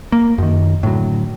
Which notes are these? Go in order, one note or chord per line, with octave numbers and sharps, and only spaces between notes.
A#3
F#2 D#3
A2 D3 F#3